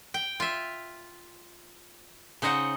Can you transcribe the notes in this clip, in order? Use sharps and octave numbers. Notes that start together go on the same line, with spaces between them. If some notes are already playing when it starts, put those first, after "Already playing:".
G5
F4 E5
C#3 D#4 C5 D#5 F#5